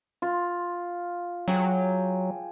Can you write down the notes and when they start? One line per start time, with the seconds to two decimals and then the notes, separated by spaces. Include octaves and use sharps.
0.22 F4
1.48 F#3 G#4 G5 D6